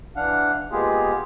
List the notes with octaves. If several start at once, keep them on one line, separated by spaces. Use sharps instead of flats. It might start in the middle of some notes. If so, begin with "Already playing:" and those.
E3 D4 F5 F#5
G#3 A#3 B3 F4 G4 G#4